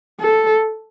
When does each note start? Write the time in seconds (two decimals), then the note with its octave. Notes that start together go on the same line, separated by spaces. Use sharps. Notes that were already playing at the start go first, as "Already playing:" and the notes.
0.20 A4